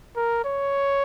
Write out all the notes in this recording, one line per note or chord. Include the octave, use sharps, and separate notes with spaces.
A#4
C#5